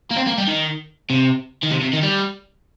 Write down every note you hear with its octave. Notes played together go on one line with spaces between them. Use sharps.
A#3
C4
A#3
G3
D#3
C3
D#3
C3
C3
D#3
G3